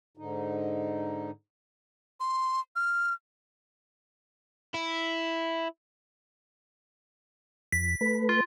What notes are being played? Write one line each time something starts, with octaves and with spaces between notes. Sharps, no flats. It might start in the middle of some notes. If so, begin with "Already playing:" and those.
G#2 D3 D#4
C6
F6
E4
F2 B6
A3 B4
F4